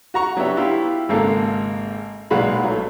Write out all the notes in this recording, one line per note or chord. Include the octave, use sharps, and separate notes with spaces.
F#4 A#5 C#6
F#3 B3 D4 G4 E5
E4 F4 G4
G#1 C#3 G#3 A#3 A4 F5
B1 A#2 G#3 F#4 F5 B5
F#3 A3